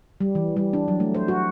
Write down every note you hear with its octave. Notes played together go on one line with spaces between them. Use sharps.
G3
E3
G3
D4
F#3
A3
C5
F#4